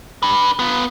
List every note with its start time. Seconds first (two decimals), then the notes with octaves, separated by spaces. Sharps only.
0.23 D4 B4
0.59 B3 F4